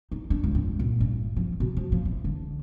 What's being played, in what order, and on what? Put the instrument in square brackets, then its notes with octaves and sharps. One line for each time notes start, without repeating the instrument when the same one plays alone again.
[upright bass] D#4
D4
C#2
G2
A#2
G2
F3
B2
F3
F3
E3
D3